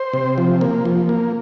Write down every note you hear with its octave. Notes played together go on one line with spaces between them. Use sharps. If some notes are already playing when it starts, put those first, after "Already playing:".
Already playing: C5
C3
F3
A#3
F3
A#3